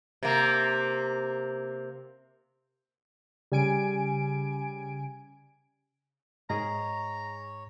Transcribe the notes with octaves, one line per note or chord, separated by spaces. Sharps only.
C3 A#3
C#3 G3 G#5 D7
G#2 G#4 C#5 D#5 A#5